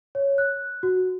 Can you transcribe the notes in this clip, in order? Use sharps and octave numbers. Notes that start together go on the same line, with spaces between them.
C#5
F#6
F#4